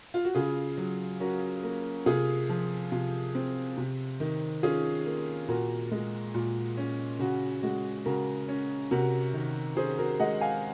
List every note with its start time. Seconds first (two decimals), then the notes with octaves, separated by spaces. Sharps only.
0.14 F4
0.25 F#4
0.35 C#3 F4 G#4
0.78 F#3
1.20 C#4 F#4 A#4
1.63 A#3
2.06 C3 F4 G#4
2.49 F3
2.92 C3 F4
3.35 C4
3.77 C3
4.20 D#3
4.63 C#4 F4 G#4
5.06 A#3
5.48 A#2 F#4 A#4
5.91 G#3
6.34 A#2
6.77 C#4
7.19 C#3 F#4
7.63 G#3 F#4
8.06 C#3 F#4 A#4
8.48 C#4
8.91 C3 F#4 A#4
9.34 D#3
9.77 C#4 G#4 C5
9.98 F#4 A#4
10.20 G#3 D#5 F#5
10.41 F5 G#5